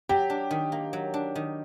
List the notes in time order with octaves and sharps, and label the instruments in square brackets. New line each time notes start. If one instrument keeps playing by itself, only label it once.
[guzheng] F#3 [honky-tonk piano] G4
[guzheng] D4
D#3
A#3
F#3
D4
D#3